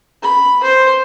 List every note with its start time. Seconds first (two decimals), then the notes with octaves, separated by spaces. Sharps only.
0.23 B5
0.63 C5